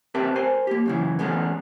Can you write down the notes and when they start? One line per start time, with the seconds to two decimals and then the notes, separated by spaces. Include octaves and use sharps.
0.15 C4 G4 A#4 B4 E5 A5
0.35 A#4 C5 G#5
0.67 A#3 G4
0.86 F#2 C#3 E3
1.19 E2 G#3 A3 B3 C#4